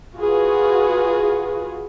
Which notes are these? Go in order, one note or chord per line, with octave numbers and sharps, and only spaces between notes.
F4 F#4 G#4 B4